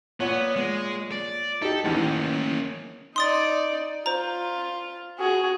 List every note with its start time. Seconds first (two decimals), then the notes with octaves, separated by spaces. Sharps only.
0.20 A#2 B3 C#5 F#5
0.56 G#3
1.12 D5
1.62 D#4 G4 A4
1.85 A1 D#3 E3 A#3 C#4
3.16 D#4 D5 C6 D#6 A6
4.06 F4 C5 A#5
5.18 F#4 G#4